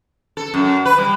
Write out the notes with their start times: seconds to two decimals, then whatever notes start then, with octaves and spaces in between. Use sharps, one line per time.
0.37 A4
0.54 F#2
0.85 B4
0.98 G3